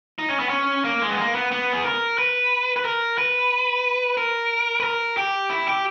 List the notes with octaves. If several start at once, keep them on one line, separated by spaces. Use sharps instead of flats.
D#4
C#4
B3
C#4
A#3
G#3
B3
A#3
B3
B3
G#4
A#4
B4
B4
A#4
B4
A#4
B4
A#4
G4
E4
G4